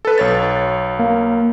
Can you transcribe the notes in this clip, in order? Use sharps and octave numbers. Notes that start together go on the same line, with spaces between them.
A4 B4
B1 C#5 A6
A#3